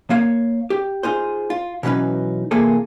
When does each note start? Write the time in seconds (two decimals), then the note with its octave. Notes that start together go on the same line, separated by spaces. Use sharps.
0.10 A#3 C#5 F5
0.70 G4
1.03 D#4 F4 G#4 C5
1.50 F4
1.83 B2 E3 F#3 C#4 D#4 B4
2.51 C3 E3 A#3 F4 G#4 A4